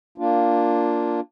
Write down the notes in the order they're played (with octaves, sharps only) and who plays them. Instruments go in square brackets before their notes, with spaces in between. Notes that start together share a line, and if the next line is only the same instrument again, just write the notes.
[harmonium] A#3 D4 F4